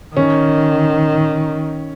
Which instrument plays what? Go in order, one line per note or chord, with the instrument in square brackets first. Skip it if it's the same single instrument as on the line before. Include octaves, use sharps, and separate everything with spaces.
[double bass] D#3 [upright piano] C#4